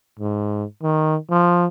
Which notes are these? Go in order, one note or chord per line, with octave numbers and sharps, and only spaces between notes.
G#2
D#3
F3